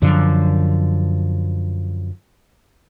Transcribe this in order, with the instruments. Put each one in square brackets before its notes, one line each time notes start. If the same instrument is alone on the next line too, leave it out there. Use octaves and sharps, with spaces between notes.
[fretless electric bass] F#2 D3 F3